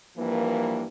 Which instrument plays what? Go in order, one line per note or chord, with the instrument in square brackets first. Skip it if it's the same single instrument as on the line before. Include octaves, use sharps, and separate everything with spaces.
[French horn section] G2 E3 F3 A#3